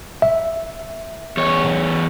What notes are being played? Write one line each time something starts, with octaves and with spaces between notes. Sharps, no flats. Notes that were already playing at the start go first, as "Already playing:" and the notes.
E5
E2 C#5